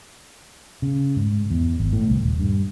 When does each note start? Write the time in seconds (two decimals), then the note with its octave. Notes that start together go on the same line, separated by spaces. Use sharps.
0.82 C#3
1.16 G#2
1.50 E2
1.80 G#1
1.93 A2
2.08 C2
2.20 D#1
2.40 G2